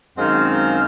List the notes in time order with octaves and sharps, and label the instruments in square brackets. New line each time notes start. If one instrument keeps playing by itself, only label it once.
[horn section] F#2 D#3 G#3 C4 C5 F5